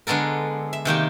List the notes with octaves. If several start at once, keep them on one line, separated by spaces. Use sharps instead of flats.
D3 G#3 B3 A4 A#4
E5
C3 D#3 A#3 G4